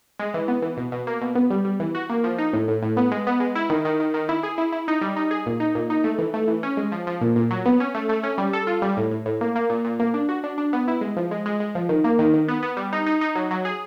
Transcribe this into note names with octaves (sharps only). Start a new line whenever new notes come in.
G#3
E3
B3
E3
B2
B2
A#3
B2
B3
G3
G3
E3
F#4
A#3
F3
D#4
A2
A2
A2
B3
G#3
B3
G#3
E4
D#3
D#3
D#3
D#3
E4
G#4
E4
E4
D#4
G3
D#4
G#4
A#2
D#4
A#2
D#4
A3
E3
A3
E3
C#4
G#3
F3
F3
A#2
A#2
F#3
B3
C#4
A3
A3
C#4
G3
A4
F4
G3
A2
A2
A2
A#3
A#3
A#2
A#2
A#3
D4
F#4
D4
D4
B3
E4
G#3
F3
G#3
G#3
G#3
F3
D#3
A#3
D#3
D#3
B3
B3
G3
D#4
D#4
D#4
F#3
F#3
G#4